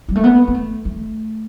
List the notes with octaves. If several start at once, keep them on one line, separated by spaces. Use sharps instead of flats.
G3
A3
B3
B3
A3
A3